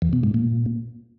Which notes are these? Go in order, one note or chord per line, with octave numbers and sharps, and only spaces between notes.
E2
B2
G#2
A#2